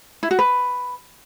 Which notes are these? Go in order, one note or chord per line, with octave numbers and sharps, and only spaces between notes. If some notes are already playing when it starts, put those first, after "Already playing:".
E4
F#4
B4